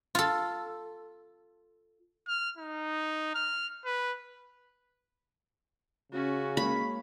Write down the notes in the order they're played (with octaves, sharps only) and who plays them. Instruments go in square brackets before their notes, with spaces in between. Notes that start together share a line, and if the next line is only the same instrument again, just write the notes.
[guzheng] F4 A4
[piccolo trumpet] F6
D#4
F6
B4
[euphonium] C#3 [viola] C#4 F#4
[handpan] G#3 A#3 C#5 [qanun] B5